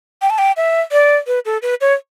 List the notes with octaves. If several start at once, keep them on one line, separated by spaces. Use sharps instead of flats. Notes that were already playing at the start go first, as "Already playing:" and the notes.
G5
A5
G5
E5
D5
B4
A4
B4
C#5